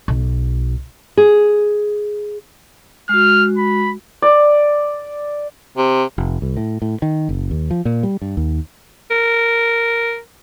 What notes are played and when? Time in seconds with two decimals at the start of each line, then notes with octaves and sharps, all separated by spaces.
0.08 B1
1.17 G#4
3.09 G#3 F#4 F6
3.58 B5
4.22 D5
5.77 C3
6.18 F1
6.42 C2
6.57 A2
6.82 A2
7.02 D#3
7.29 F#1
7.51 D#2
7.71 F3
7.85 A#2
8.03 G3
8.22 G2
8.37 D#2
9.11 A#4